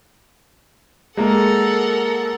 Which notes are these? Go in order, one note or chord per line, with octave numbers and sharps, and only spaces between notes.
G#3 A#3 A4 A#4 F#5